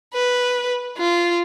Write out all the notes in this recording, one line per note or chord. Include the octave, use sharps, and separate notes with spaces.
B4
F4